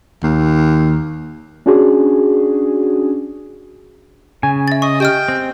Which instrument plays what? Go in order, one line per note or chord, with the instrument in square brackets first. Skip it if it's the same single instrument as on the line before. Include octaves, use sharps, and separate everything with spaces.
[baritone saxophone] D#2
[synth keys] C#4 D4 F#4 G#4
[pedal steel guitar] C#3 [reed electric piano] G#5
[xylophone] E5 A6
[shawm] D#5 [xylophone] C#6
[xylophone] G4 D#5 F6 [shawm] G5
[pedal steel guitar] C4